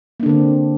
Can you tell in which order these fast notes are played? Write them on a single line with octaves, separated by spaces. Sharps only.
A#3 D4 D3 C4